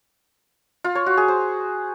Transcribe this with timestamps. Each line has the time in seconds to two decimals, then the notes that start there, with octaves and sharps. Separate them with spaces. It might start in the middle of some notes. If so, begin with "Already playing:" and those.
0.84 F4
0.95 C#5
1.06 F#4
1.17 G#4
1.28 C5